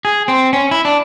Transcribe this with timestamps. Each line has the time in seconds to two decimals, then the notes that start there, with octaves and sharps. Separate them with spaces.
0.05 G#4
0.28 C4
0.53 C#4
0.71 E4
0.85 D4